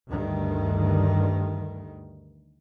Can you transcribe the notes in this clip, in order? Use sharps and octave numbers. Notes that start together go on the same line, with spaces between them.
D2 G2 D#3